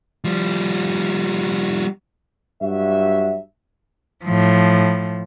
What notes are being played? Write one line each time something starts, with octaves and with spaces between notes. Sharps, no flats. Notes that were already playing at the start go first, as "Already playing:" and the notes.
F3 G3
G2 F#3 F#4 E5
A2 F3